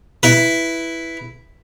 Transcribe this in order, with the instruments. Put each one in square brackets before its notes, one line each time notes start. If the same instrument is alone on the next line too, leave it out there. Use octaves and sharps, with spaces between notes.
[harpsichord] E4 B4